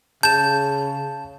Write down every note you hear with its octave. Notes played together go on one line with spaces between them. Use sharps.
C#3 A5 G6 E7